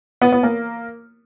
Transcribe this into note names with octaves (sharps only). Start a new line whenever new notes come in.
B3
B3
A#3